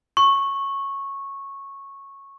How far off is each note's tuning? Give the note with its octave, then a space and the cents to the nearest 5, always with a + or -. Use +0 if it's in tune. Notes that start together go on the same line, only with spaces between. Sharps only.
C#6 -10